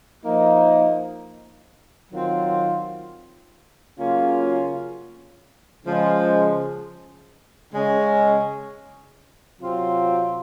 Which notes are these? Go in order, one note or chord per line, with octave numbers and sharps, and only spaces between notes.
F3 A#3 D#4
D#3 F#3 C4 F4
C#3 F#3 A#3 C#4 F4
C#3 F3 G#3
C#3 G#3 C#4
C3 F#3 C4 F4